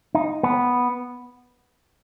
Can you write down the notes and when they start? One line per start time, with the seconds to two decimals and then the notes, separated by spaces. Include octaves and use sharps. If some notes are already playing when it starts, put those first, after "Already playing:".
0.15 D#4
0.43 B3